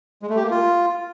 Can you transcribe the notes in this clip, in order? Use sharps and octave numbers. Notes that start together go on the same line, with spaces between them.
G#3
A3
G4
A#3
F4